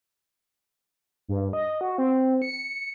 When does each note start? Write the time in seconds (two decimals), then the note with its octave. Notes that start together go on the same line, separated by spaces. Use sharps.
1.28 G2
1.53 D#5
1.81 F#4
1.98 C4
2.42 C#7